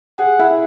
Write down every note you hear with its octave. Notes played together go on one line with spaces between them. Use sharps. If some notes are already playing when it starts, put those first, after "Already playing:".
G#4 F#5
E4